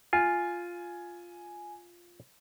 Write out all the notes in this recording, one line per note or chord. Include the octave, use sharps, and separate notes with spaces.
F4 G#5